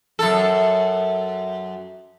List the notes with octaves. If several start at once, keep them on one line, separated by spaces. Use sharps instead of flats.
F#2 A4